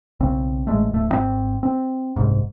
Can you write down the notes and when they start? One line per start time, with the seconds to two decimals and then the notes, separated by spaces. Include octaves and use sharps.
0.20 B1 C#3 C4
0.67 A1 G#3 A3
0.91 D1 A3
1.09 G#1 E3 C4
1.63 C4
2.16 F#1 C2 G#2